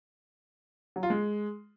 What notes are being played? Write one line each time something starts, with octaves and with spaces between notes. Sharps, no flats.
F#3
F4
G#3